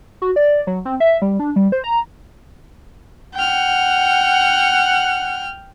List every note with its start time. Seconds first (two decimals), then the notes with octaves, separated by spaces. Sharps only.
0.22 F#4
0.36 D5
0.67 F#3
0.85 C4
1.00 E5
1.22 G3
1.40 D4
1.56 G3
1.72 C5
1.84 A#5
3.34 F#5 G5 F6